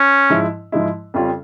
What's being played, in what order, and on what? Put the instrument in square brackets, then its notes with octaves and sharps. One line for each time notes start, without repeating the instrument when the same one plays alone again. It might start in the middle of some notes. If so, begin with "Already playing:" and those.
Already playing: [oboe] C#4
[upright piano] G#2 F3 G#3 E4
G#2 F3 G#3 E4
F2 C#3 G3 C#4 F4